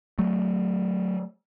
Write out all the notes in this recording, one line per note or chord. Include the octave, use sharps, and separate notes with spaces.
F#3 A3